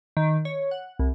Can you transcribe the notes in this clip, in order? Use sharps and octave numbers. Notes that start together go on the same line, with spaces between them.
D#3
C#5
F#5
C2